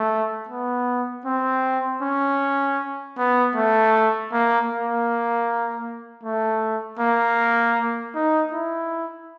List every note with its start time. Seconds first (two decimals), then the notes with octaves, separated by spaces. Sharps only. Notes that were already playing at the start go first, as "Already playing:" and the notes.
Already playing: A3
0.49 B3
1.25 C4
2.02 C#4
3.17 B3
3.56 A3
4.32 A#3
4.69 A#3
6.23 A3
6.99 A#3
8.15 D#4
8.52 E4